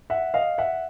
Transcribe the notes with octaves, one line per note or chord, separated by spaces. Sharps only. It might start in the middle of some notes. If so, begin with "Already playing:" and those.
E5 F#5
D#5 F5
E5 F#5